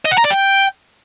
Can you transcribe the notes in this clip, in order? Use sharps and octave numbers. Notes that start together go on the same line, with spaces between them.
D#5
F#5
A#5
D5
G5